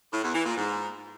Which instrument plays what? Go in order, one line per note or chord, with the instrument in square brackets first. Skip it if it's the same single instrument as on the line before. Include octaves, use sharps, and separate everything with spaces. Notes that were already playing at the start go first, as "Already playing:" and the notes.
[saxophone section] A2
E2
E3
A#2
G#2